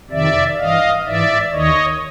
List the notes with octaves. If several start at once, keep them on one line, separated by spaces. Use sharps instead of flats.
F2 C3 D#3 D5 E5
G2 E3 D#5 F5
G#2 E3 D5 E5
D#2 D#3 C#5 D#5